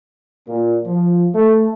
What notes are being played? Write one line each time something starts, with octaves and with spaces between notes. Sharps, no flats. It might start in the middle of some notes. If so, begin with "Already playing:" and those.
A#2
F3
A3